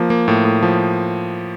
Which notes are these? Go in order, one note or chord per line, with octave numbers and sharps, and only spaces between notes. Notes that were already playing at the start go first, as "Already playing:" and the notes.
Already playing: F3 A#3
A#3
A2
A2
F3